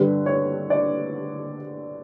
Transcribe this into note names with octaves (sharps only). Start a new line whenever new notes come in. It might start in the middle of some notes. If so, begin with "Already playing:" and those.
Already playing: G2 D3 G3 B4
C#5
D5